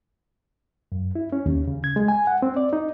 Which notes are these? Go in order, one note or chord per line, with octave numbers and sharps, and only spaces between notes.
F#2
E4
C#4
D#2
C#3
G#6
G#3
G#5
F#5
C4
D5
D#4